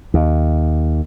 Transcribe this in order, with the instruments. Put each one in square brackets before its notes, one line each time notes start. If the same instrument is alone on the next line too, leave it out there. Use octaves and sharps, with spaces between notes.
[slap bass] D#2